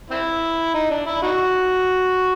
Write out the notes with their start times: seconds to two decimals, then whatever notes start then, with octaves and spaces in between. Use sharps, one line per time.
0.10 C4 E4
0.74 D#4
0.90 D4
1.06 E4
1.23 D#4 F#4